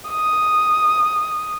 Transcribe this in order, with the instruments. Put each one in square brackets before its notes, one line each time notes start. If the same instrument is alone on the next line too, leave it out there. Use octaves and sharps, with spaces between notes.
[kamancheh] D#6